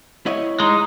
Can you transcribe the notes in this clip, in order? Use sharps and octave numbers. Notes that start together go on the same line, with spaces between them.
E4 C#5 D#5
G#3 D#4